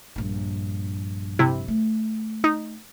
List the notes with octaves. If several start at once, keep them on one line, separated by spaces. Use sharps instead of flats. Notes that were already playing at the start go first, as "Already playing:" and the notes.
A#1 G2
C3 E4
A3
D#4